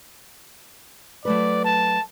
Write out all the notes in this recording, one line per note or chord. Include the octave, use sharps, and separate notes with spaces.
F#3 A3 B4 D5
A5